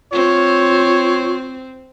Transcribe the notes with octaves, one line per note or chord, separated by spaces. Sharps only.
C4 F4 C#5